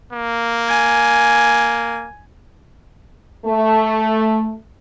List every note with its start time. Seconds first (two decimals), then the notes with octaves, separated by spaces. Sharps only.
0.13 A#3
0.68 G#5
3.46 A3